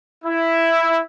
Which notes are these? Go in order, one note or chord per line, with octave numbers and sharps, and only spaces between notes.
E4